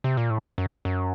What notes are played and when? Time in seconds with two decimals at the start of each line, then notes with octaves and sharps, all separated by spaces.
0.04 C3
0.17 A#2
0.30 A2
0.58 F#2
0.85 F#2